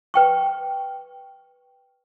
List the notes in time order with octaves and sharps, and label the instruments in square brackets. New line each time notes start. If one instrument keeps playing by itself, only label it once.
[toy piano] B4 G5 C#6